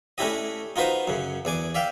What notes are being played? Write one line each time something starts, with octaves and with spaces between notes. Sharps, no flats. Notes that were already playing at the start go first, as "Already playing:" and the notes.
A3 C#4 D4 E4 G4 D#5
D#4 F4 F#4 B4 C5
F#2 C#3
E2 D5 G#5 D6
D5 E5 F5 G5